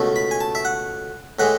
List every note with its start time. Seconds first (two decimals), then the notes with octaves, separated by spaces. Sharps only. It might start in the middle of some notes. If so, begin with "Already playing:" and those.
Already playing: C#2 B2 A3
0.16 B5
0.31 G#5
0.41 A5
0.55 E5
0.65 F#5
1.39 A2 E3 G#3 F#5